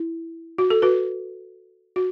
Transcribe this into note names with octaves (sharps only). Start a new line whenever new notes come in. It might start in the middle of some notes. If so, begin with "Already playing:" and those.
Already playing: E4
F#4
A4
F#4 B4
F#4